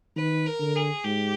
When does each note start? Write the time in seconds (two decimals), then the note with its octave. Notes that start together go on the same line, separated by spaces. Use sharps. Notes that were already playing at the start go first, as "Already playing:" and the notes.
0.16 D#3 B4
0.46 A#4
0.60 D3
0.75 G#4
1.04 G#2 G4